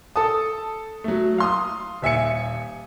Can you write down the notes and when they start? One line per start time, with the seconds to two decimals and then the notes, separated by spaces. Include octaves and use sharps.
0.16 A4 A5 D#6
1.04 F#3 A3
1.38 F5 C6 D#6
2.02 D#1 E5 G#5 C#7